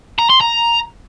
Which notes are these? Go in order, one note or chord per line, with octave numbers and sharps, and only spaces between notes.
A#5
C6
A#5